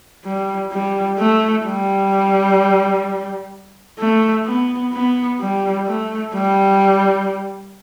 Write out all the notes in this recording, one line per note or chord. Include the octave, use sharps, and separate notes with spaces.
G3
G3
A3
G3
A3
B3
B3
G3
A3
G3